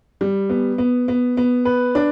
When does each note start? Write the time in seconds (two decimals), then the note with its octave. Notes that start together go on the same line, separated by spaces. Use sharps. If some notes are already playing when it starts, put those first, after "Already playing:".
0.21 G3
0.50 B3
0.78 B3
1.08 B3
1.37 B3
1.65 B4
1.95 D4